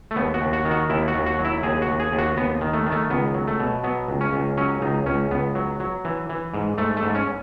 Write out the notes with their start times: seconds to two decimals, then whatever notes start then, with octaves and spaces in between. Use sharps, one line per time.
0.11 A3
0.16 D#2 B3
0.34 F#4
0.41 D#2
0.53 F#4
0.65 D#3
0.71 F#4
0.90 D#2 E4
1.08 F#4
1.14 D#2
1.26 F#4
1.39 F#3
1.45 E4
1.63 D#2 G#4
1.82 F#4
1.87 D#2
2.00 G#4
2.12 D#2
2.18 F#4
2.37 D#2 B3
2.61 D#3
2.73 A3
2.86 D#3
2.92 A3
3.10 C#2 B3
3.34 F#3
3.47 A3
3.60 B2
3.84 F#3 B3
4.08 C#2
4.21 C#4
4.33 C#2
4.57 F#3 C#4
4.82 C#2 D#4
5.06 C#2 C#4
5.31 C#2 B3
5.55 F#3
5.80 F#3
6.05 E3
6.29 E3
6.54 G#2
6.78 G#2 A3
6.97 A3
7.03 G#2
7.15 C#4